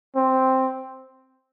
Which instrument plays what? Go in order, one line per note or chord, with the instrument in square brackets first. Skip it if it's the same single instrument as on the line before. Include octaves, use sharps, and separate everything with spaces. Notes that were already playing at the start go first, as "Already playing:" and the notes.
[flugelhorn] C4